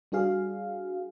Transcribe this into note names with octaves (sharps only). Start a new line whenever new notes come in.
G3 D4 F#4 G#4 F5